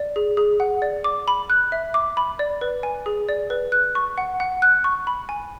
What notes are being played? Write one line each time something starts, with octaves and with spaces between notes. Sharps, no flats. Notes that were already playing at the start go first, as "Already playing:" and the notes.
Already playing: D5
G#4
G#4
F#5
D5
D6
B5
F#6
E5
D6
B5
D5
B4
G#5
G#4
D5
B4
F#6
C#6
F#5
F#5
F#6
C#6
B5
G#5